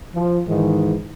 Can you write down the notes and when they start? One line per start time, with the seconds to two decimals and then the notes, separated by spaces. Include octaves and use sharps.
0.14 F3
0.48 G#2 D#3 E3